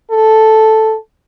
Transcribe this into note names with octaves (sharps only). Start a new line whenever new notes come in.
A4